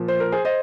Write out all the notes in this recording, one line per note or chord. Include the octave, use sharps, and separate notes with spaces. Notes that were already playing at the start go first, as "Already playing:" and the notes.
Already playing: A#2 F3
C5
A#4
G#4 C5
C5 D#5